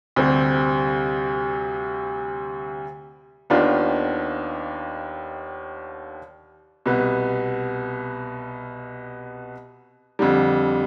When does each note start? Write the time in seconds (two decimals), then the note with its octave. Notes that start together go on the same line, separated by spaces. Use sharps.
0.16 D2 C3 G3 C4
3.50 D#2 D#3 B3 D4 F4
6.86 C2 B2 B3
10.19 F2 D3 G3